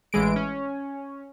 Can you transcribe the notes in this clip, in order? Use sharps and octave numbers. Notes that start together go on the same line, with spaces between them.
A1 E3 G#3 D7
C#4